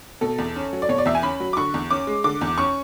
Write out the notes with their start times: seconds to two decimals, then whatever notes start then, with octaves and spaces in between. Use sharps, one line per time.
0.21 B2 A4
0.38 E2
0.56 C#4
0.73 F#3
0.82 D5
0.89 B2 C#5
0.98 D5
1.05 E2 E5
1.15 G#5
1.22 C#4 B5
1.40 F#3
1.53 D6
1.57 D3 C#6
1.74 E2
1.91 C#4 D6
2.07 G#3
2.24 D3 D6
2.41 E2
2.58 C#4 C#6